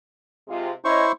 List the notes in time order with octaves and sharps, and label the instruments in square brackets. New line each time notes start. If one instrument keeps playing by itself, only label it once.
[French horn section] C3 G#3 F4
[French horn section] C#4 C#5 D#5 [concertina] E4 C5 C#6